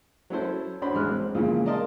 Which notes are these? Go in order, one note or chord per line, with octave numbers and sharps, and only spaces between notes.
F#3 C#4 E4 A4 C5
C#4 D4 F#4 C5 B5 C6
A1 G#3 F6 F#6
C4
A#2 C#3 E3 F3 G#3
A#4 D5 D#5 F5 A5 C6